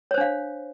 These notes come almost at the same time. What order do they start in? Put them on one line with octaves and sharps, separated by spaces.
C#5 C5 D4 F5